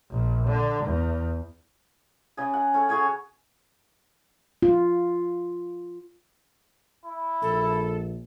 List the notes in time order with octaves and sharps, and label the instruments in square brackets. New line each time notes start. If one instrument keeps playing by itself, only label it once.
[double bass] A#1
D3
E2
[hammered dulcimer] C#3 G#4
F#5
C#4 A4
F#4 G#4 C#5 G#5
[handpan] F4
[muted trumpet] E4
[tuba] A#1 [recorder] A4